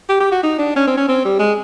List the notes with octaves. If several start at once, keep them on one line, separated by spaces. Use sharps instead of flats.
G4
G4
F#4
D#4
D4
C#4
C4
C#4
C4
G3
G#3